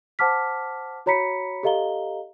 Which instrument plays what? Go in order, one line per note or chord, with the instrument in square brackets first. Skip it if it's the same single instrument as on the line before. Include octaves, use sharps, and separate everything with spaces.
[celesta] C5 F#5 A5 D6 F6 B6
F#4 C#5 A#5 B5 B6 C#7
G4 A4 D#5 F5 A#5 G7